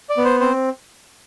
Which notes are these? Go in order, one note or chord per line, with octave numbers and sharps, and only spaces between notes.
D5
B3
C5
C4 C5